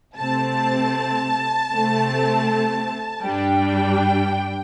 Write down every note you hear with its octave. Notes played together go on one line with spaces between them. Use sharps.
C3 A3 C4 A5
C3 A3 C4
G2 G3 D4 G5